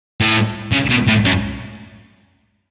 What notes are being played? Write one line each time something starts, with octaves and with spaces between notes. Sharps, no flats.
A2
C#3
B2
A2
F#2